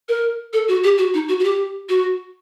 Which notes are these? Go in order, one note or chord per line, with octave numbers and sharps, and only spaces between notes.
A#4
A4
F#4
G4
F#4
D#4
F#4
F#4
G4
F#4